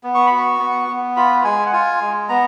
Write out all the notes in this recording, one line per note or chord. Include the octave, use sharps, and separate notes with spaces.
B3
C#6
F#4 B5
C#6
B3
B3
F4 B5
G#3 G#5
F#5
F4 G#5
G#3
B3 A#5